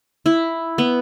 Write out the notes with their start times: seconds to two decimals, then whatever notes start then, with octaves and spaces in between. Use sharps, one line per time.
0.26 E4
0.78 B3